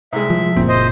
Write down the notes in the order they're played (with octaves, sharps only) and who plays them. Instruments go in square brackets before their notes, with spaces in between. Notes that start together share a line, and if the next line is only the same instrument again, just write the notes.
[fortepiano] C2 G#3 [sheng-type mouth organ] E5
[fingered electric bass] F3
[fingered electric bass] F#1 A#2 [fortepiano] C4
[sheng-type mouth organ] C5 D#5